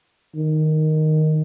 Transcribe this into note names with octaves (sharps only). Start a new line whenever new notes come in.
D#3